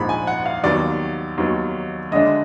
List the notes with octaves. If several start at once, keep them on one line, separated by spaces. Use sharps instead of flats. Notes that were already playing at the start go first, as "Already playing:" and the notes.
Already playing: A#1 G#2 F3 B5
G#5
F#5
F5
D#2 D#3 F#3 B3 D5
D#2 D#3 F#3 B3
D2 D3 G#3 D4 D#5